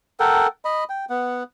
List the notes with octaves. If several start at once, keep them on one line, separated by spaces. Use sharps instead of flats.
A4 A#4 F#5 G5
D#5 B5
G5
B3 F#5